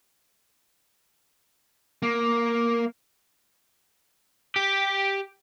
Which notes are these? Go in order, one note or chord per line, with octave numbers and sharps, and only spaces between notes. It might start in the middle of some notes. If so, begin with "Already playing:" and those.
A#3
G4